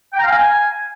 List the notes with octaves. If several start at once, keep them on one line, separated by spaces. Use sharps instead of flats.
G5
A#5
F5
G#5